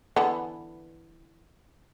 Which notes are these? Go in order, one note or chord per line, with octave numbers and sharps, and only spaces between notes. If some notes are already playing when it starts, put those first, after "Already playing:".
D3 E3 B3